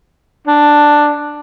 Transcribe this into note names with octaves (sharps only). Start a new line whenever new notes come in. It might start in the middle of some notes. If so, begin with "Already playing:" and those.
D4